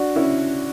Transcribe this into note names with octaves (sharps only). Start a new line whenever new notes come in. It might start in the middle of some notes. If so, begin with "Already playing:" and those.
Already playing: D4 F#4
C#4 E4